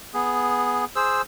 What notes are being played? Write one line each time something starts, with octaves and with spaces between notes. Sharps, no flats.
B3 G#4
G#4 C5 E6